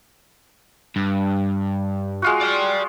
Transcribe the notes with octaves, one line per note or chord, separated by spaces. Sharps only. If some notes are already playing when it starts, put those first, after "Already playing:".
G2
G#3 F4 F#4
D5 G5